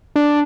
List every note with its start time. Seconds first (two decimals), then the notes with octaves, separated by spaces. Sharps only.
0.16 D4